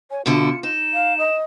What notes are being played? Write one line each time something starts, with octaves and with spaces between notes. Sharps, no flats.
C#5 G#5
B2 D3 E4 F4 C#7
D#4 E7
F5
D#5